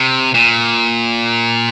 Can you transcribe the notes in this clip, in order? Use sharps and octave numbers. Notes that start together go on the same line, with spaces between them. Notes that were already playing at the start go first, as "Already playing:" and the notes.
Already playing: C3
A#2